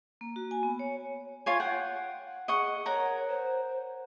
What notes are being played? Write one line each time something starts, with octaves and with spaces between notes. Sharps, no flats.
A#3
F#4
G#5
B3
C#5
F4 C#5 G#5
F#5 G5
G#4 D#5 F#5 C#6
A#4 C#5 F#5
C5